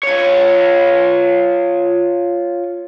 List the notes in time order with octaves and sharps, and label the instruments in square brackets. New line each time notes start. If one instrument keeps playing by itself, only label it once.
[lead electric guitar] F4 C#5